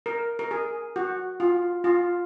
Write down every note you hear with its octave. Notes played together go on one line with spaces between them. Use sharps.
A#4
A#4
G#4
F#4
F4
F4